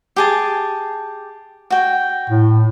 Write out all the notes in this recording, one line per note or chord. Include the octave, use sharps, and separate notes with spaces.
G4 G#4 A5
F#4 G5
A2